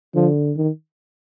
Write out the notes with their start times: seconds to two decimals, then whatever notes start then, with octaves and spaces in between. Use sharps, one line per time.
0.14 D3 F3
0.56 D#3